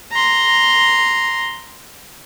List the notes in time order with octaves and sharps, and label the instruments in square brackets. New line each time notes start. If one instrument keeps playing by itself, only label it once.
[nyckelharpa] A#5 C6